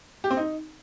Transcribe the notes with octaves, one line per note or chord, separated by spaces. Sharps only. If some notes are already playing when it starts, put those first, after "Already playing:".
G4
C4
D#4